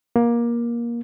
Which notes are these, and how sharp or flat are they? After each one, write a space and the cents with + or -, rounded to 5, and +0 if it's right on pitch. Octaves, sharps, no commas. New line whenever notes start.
A#3 +20